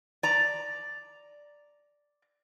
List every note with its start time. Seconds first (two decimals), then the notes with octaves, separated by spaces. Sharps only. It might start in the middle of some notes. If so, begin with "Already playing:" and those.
0.23 D5 A#5